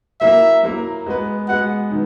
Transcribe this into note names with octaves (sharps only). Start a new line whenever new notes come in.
F#3 A#3 E4 A#4 E5
F#3 A#3 E4 A#4
G#3 B3 F#4 B4
G#3 B3 F#4 B4 F#5
D#3 F#3